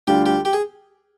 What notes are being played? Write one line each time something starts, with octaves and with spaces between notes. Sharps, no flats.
D2 D3 G3 D4 F4 G4
G4
G4
G#4